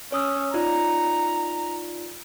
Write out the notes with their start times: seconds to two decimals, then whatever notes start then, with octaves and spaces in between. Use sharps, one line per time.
0.12 C#4 C#5 D#6 E6
0.54 D#4 F4 D5 A#5